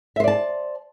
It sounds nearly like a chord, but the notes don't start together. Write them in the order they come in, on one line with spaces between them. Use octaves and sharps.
E5 C5 D5 A5